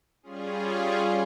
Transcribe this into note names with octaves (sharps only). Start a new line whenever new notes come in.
G3 C#4 F4 G#4